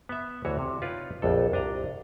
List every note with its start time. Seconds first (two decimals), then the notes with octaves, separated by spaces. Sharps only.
0.09 B3 E5
0.45 D2 E3 F#4 C#5
0.59 C3
0.82 D#4 F4 B4 C#5 D5
1.22 A#1 F2 A4
1.52 C2 D4 D#5 A#5